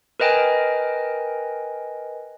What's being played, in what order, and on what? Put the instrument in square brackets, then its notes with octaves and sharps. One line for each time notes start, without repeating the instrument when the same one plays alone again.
[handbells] A#4 B4 D#5 G5 G#5